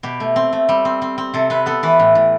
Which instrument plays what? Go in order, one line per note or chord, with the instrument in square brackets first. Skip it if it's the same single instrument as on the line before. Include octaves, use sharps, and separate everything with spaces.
[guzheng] B2 G4
A3
C4
A3
G3
C4
C4
C4
C3 A4
C3 B4
B3 A4
E3 B4
A2
A2